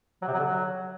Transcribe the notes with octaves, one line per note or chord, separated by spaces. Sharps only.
F#3
C3
F#3
D3
F#3